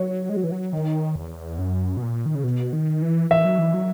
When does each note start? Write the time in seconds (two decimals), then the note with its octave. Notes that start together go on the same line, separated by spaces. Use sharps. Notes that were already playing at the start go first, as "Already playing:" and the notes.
Already playing: F#3 C#5
0.29 G#3
0.37 F#3
0.44 E3
0.52 F#3
0.73 D#3
1.16 E2
1.58 F#2
1.97 B2
2.02 A#2
2.26 D#3
2.35 C#3
2.44 B2
2.73 D#3
3.02 E3
3.30 E3 E5
3.45 F#3
3.59 E3
3.74 F#3